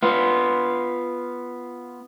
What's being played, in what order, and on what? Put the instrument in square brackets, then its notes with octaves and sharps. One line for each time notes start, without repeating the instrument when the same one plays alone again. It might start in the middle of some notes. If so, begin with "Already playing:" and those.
[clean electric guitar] B3 F4